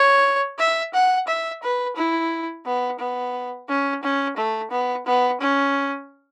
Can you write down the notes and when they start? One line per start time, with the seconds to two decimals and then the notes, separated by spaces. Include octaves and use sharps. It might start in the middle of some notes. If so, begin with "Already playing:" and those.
Already playing: C#5
0.58 E5
0.94 F#5
1.27 E5
1.63 B4
1.96 E4
2.66 B3
2.99 B3
3.69 C#4
4.03 C#4
4.37 A3
4.71 B3
5.06 B3
5.41 C#4